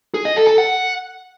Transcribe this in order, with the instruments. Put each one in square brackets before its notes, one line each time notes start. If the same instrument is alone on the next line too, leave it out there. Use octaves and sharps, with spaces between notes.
[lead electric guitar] G#4
D#5
A4
A4
F#5